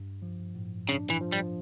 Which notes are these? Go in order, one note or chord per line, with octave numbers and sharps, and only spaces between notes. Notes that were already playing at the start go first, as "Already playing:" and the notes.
Already playing: G2
F3
A2
C#3 D4
E3
F3
G3